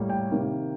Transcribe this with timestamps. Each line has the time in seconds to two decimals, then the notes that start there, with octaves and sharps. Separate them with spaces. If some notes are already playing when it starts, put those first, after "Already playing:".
Already playing: A2 G3 A#3
0.10 G5
0.31 C3 D#3 A#3